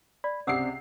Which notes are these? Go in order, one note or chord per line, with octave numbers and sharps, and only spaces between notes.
D5 B5
C#2 C3 C4 D5 F#5 D#6 E6 C7